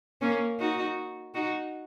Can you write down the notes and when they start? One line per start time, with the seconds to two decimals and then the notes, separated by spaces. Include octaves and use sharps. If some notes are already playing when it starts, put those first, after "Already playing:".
0.21 A#3 C#4
0.60 D#4 F#4
1.34 D#4 F#4